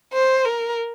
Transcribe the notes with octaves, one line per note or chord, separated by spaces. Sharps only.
C5
A#4